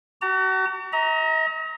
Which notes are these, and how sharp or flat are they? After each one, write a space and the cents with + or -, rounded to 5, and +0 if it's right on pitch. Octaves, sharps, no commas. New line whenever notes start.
F#4 +35 A#5 -45
D#5 +45 A#5 +0